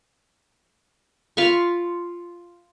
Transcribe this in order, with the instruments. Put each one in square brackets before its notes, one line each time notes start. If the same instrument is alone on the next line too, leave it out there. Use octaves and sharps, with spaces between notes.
[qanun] F4 F5 B5 C#6